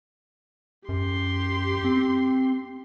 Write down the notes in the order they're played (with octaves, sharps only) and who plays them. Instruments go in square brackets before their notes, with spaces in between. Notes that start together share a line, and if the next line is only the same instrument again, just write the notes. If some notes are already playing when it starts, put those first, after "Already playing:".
[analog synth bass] F#2 [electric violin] G4 C6
[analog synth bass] C4